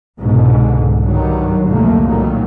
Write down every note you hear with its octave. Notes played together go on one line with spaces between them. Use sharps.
C2 G#2 B2 D3
G2 D#3 F#3 G3
C2 F2 A#2 D3 A3 A#3
A#2 D#3 F#3 G3